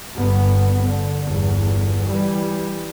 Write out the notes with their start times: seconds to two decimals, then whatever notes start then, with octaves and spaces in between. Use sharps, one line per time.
0.15 G1 B3
0.86 D3
1.24 G1 E2
2.03 E3 G3